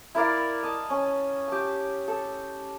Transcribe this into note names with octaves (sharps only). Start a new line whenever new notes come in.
E4 A#4 D5 F5
D#5 A5
C#4
G4 A5
A4